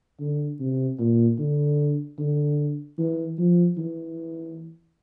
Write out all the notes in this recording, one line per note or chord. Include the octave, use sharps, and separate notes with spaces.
D3
C3
A#2
D3
D3
E3
F3
E3